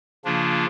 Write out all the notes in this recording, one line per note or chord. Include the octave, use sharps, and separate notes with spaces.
C#3 F3 A#3 D4 F4